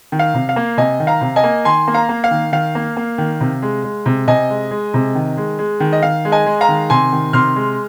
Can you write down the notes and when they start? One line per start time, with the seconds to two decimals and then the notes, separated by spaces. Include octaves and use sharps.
0.12 D#3
0.19 F5
0.34 C3
0.49 F5
0.56 A#3
0.77 C3 D#5 G#5
1.00 D#3
1.07 F5 A#5
1.21 C3
1.36 D#5 G#5
1.44 A#3
1.65 D#3 G#5 C6
1.87 A#3
1.94 F5 A#5
2.09 A#3
2.24 F5
2.31 D#3
2.52 D#3 F5
2.75 A#3
2.97 A#3
3.18 D#3
3.41 C3
3.62 G#3
3.84 G#3
4.06 C3
4.28 C3 D#5 G#5
4.50 G#3
4.71 G#3
4.94 C3
5.15 D#3
5.37 G#3
5.59 G#3
5.80 D#3
5.93 D#5
6.03 D#3 F5
6.25 G#3
6.32 D#5 G#5
6.46 G#3
6.61 F5 A#5
6.69 D#3
6.90 C3 G#5 C6
7.12 D#3
7.33 C3 C6 F6
7.56 G#3